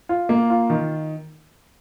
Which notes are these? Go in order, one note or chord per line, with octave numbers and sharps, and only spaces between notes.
F4
A#3
F4
D#3